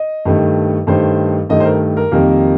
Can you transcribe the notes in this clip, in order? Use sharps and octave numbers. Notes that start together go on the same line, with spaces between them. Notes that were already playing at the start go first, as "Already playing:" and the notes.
Already playing: D#5
G2 D#3 A3
G2 D#3 A3 C5
G2 D#3 A3 D#5
C5
A#4
A#4
F2 D#3 G3 A#3